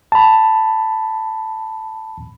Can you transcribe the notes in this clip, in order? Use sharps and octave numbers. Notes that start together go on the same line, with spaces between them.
A5 B5